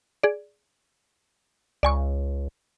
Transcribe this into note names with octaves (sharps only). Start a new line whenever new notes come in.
G#4 D5
C#2 D5 G#5 C#6